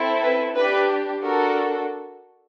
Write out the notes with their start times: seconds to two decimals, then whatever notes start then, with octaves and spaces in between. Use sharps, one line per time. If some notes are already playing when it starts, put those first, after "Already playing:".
Already playing: C4 E4 A4
0.22 B4
0.56 D4 G4 B4
1.23 D4 F#4 A4 A#4